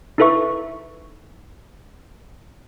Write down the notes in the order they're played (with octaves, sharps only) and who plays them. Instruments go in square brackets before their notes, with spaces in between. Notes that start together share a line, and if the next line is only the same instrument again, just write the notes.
[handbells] D#4 E4 A4 B4 E5 C#6